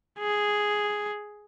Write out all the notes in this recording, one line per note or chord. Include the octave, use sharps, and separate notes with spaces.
G#4